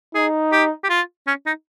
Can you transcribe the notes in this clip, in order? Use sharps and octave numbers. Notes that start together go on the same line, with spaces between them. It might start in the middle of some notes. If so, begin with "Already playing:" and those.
D#4 G#4
G4
G4
F4
C#4
D#4